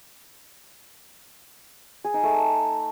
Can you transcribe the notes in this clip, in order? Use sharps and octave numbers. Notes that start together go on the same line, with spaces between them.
G#4
D#4
A3